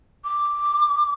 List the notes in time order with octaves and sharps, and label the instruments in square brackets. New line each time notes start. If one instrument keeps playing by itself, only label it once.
[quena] D6